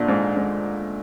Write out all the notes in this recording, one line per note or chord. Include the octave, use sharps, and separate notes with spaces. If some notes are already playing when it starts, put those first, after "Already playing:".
Already playing: A#2 D3 F3 A3 D4
G#2
G#2